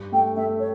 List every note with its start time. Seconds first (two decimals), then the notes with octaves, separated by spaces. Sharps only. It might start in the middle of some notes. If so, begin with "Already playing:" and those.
Already playing: G2
0.12 A3 G5
0.36 A3 E5
0.59 C#5